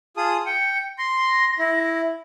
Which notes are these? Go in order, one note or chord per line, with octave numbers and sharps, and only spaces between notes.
F4 G#4 A5 D#6
G5 C#7
C6 A#6
E4